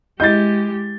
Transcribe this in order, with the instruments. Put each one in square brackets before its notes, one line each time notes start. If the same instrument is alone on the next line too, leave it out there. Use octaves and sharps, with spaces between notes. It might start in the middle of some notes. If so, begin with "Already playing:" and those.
[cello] G#3 G4 [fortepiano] E4 D#5 [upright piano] G6 A6